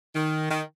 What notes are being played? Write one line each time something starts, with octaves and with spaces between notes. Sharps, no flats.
D#3
D#3